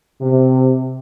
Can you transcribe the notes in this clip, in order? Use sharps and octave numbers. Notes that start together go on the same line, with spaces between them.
C3